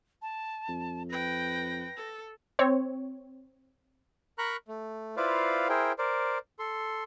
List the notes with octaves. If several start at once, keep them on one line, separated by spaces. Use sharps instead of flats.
A5
F2
B4 G5 A#6
A4
C4 C#5
A#4 A#5 B5 C#6 F#6
A3
E4 F4 B4 C5 D5 F5
E4 G#4 A#4 C5 G5
A#4 C5 D5
A4 C6